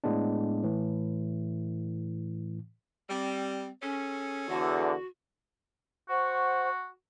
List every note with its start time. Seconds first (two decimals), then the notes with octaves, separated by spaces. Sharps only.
0.04 A2 G#3 B3 D4
0.64 A2 E3
3.09 G3 C4
3.82 C#4 G#4 A4 C#5
4.49 E2 D3 F#4
6.09 F#4 C5 F#5 C#6